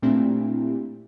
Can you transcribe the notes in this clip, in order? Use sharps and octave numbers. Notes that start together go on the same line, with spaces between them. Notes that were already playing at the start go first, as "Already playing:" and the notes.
A#2 A3 C4 D4 E4 G4